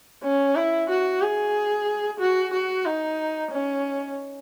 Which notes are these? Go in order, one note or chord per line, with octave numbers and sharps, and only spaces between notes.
C#4
E4
F#4
G#4
F#4
F#4
D#4
C#4